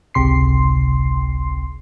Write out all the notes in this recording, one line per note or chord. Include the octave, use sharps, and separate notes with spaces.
G#1 C#2 C3 C6 C7